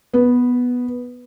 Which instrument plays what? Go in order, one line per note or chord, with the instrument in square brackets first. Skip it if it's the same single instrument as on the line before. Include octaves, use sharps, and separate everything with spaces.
[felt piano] B3